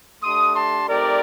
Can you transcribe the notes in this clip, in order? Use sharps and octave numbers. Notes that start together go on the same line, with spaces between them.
A3 D4 G4 C6 D#6
A5 C6
A3 C4 D#4 G4 A#4 D5